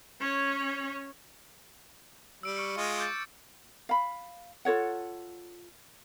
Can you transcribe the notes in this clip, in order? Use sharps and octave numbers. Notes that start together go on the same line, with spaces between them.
C#4 C#5
G3 E6 D7
C#6 F6 C#7
G#3 F4 D#5
D6 G6 A6
F5 B5
F4 A4 C#5 F#5